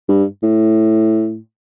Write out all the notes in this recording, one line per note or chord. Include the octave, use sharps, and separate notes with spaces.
G2
A2